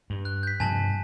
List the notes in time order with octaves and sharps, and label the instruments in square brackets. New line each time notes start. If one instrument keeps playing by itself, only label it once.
[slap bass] G2
[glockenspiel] F#6
G6 B6
[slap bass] G2 C3 F3 [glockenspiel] G#5 A5